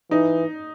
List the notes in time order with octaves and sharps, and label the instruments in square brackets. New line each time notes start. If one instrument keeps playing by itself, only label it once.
[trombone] E3 [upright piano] D#4